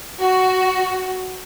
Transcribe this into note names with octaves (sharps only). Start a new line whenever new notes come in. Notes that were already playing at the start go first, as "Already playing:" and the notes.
F#4